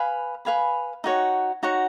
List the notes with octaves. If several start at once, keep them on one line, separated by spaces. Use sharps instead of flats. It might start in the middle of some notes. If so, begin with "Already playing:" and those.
Already playing: B4 F5 G#5 B5
B4 F5 G#5 B5
D#4 F#4 C#5 F#5
D#4 F#4 C#5 F#5